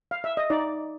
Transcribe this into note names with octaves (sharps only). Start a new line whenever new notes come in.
F5
E5
D#5
D#4 D5